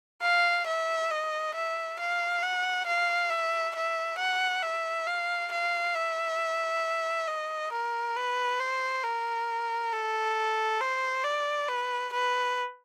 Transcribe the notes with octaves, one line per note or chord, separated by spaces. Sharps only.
F5
E5
D#5
E5
F5
F#5
F5
E5
E5
F#5
E5
F5
F5
E5
D#5
A#4
B4
C5
A#4
A4
C5
D5
B4
B4